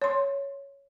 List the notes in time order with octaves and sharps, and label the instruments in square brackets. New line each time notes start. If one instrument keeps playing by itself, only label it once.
[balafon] C#5 C6